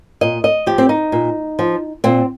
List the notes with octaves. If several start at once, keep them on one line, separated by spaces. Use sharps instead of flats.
A#2 D#5
D#5
F3 G4
C4
D#4
A#2
F3
A#2 C4